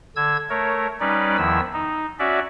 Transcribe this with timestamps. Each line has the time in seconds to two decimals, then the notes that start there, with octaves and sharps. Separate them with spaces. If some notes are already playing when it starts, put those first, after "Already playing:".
0.16 D3 E6 G#6
0.50 A3 A#4 C#5
1.00 G3 C#4 D#4 B4 D5
1.38 E2 D#3 F3 E4 E6
1.74 D#4
2.19 C#4 F#4 D5 E5